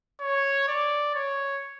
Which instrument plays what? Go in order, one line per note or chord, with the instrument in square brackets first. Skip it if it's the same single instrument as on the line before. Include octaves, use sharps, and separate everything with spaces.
[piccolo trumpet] C#5
D5
C#5